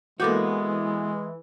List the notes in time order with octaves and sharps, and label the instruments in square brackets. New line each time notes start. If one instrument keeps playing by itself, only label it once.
[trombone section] E3 [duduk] G#3 [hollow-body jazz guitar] A#3 B3 F#4 [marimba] A4 D6 G6